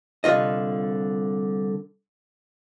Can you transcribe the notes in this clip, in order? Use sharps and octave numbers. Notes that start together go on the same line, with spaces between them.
C2 D3 F4 D#5